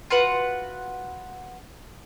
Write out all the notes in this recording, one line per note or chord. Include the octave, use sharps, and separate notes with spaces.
F4 F#4 B4 F#5